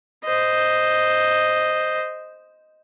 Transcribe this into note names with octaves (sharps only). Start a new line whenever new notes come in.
C5 D#5